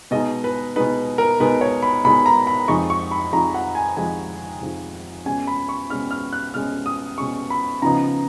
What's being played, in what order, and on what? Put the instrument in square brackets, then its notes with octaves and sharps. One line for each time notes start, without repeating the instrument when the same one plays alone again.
[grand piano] B2 G#3 D#4 D#5
B4
B2 G#3 D#4 B4
A#4
B2 G#3 D#4 B4
C#5
B5
B2 G#3 D#4 B5
A#5
B5
F2 F3 G#3 D#4 C#6
C#6
B5
F2 F3 G#3 D#4 A#5
F#5
G#5
F2 F3 G#3 D#4 G#5
F2 F3 G#3 D#4
B2 G#3 C#4 G#5
B5
C#6
B2 G#3 C#4 F6
F6
F#6
B2 G#3 C#4 F6
D#6
B2 G#3 C#4 C#6
B5
C#3 F3 B3 D#4 A#5